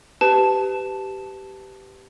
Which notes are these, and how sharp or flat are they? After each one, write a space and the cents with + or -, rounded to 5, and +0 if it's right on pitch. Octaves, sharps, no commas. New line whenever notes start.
G4 -10 B4 +25 A5 +0